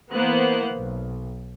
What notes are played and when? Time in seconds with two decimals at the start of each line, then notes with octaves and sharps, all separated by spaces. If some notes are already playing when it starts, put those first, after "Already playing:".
0.12 E3 A#3 B3 A#4 C5 F#6
0.72 B1